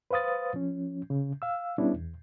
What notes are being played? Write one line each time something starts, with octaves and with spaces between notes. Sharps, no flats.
B4 C5 F5 D#6 A6
F3 C#4
C#3
F5 E6
G3 B3 C#4 D4 E4
E2